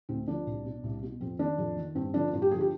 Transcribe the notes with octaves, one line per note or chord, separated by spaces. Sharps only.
D2 C4
D3 F3 D4
C2
B2
C2
B2
F2 C4
D#3 D4
F2
D#3
G2 C4
D3 F3 D4
G2
G4
D3 F3 G#4
G4